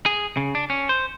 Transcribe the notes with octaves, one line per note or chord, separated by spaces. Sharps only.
G#4
C#3
D4
C#4
C5